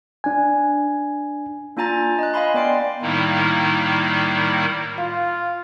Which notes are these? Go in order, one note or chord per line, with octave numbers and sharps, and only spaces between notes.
D4 G#5
A#3 D4 F4 G#5 A#5 A6
D#5 F#6
D#5 F5 G#5 B5 C6
B3 D5 G5 C6 C7
A2 D#3 G3 A#3 D#4 E4
F4 F5